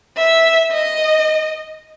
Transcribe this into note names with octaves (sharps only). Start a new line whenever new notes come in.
E5
D#5